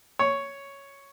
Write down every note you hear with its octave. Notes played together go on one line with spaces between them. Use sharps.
C#5